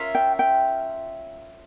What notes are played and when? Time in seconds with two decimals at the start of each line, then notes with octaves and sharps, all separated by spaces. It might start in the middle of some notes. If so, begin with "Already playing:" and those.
Already playing: C#4 F4 A#4 E5
0.15 G5
0.39 G5